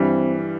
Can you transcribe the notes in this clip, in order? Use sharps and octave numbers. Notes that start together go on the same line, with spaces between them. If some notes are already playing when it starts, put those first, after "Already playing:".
Already playing: G2 E3 G3 C4